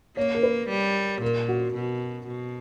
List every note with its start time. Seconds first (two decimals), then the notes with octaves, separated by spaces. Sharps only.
0.17 A#3 C#5
0.35 A#4
0.43 B4
0.69 G3
1.22 A#2 A#4
1.48 F#4
1.74 B2
2.27 B2